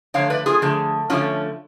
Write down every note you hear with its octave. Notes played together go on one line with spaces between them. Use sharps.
D3 F3 A3 C#5 F5
B4 D5
F4 G#4
D3 F3 A3
D3 F3 A3 C#4 F4